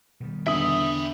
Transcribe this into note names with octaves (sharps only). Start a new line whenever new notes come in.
B2 D#3 G3
E2 D3 E5 G5 B5 D#6